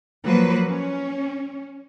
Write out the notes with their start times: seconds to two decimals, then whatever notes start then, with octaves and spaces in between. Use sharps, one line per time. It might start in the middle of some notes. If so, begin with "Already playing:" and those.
0.25 F3 F#3 A#3 B4
0.69 C#4